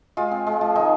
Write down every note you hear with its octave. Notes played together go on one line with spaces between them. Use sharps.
G#3 F4
C4
G#3
F3
D#3 D#4